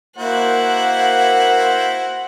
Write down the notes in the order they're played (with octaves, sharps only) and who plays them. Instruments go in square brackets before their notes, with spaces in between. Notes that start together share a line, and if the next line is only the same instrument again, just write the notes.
[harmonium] A#3 [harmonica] E4 F#4 [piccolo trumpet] C5 [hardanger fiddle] F#5